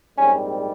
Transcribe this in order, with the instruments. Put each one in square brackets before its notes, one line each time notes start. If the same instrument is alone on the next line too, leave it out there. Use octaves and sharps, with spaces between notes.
[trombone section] A#1 G#2 G3 C4 C#4